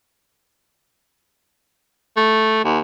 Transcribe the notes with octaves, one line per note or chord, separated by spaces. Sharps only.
A3
D#2